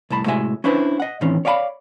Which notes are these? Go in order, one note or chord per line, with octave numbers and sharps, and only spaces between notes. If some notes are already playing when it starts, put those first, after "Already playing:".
C2 A2 A5 B5
A2 C3 G#3 F#4 E5 G#5
C#4 D4 E4 B4 C5
D#5 F#5
A2 D#3 E3 C4 C#4
C#5 D5 F5 G5 B5